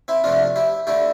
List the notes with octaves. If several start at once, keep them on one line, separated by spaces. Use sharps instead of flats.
C4 E4
F2 C3 F3 A3 D4 F4
E4 G4
D3 A3 E4 G4